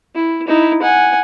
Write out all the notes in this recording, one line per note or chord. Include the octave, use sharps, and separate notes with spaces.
E4
D#4 E4
F#5 G#5